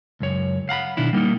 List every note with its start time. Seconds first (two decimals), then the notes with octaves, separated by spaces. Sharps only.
0.20 C#2 F#2 C#5
0.69 F5 F#5 A#5 B5
0.97 B2 D#3 D4 E4
1.13 G3 A#3 D#4